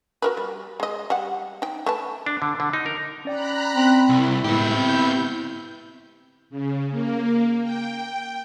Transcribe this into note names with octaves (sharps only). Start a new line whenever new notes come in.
F#4 A#4 B4
G3
G#3 D#5
G3 F#5
D#4 G5
A3 B4 A5
D4
D3
D3
D#4
A#4
C#4 D5 G5 A#5 B5 F#6
C4
C2 E4
A2 D3 G#3 B3 E4 G4 G6
C4
C#3
A#3
G5